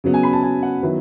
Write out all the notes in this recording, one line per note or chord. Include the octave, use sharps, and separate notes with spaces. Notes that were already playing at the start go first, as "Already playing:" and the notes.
C#3 F#3 B3
G#5
B5
A5
G#5
F#5
D#3 F#3 B3 E4 B4